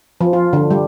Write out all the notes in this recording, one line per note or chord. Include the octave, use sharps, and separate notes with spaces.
F3
F4
D3
G3